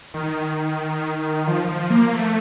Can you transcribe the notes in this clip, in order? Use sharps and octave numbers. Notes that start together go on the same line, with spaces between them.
D#3
F3
F3
A#3
A3